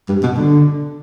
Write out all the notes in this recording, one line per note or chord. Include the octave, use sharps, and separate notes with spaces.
G2
B2
D3